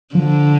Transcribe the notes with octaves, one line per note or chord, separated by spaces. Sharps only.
D3 F3